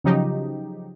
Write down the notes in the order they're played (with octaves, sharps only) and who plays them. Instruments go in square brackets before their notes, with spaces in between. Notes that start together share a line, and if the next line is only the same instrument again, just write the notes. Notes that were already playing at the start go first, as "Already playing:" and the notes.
[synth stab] C#3 F3 F#3 D#4 G4